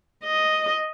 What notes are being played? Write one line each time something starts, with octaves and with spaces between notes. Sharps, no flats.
D#5